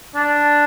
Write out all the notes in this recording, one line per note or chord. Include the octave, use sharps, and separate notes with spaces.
D4